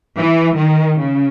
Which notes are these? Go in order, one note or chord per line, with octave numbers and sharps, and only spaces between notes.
E3
D#3
C#3